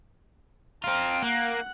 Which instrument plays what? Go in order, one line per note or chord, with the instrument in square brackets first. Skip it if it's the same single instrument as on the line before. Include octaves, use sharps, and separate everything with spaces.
[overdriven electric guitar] C4 F4 [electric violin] A#5 F6
[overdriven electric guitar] A#3 [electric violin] F#5 F#6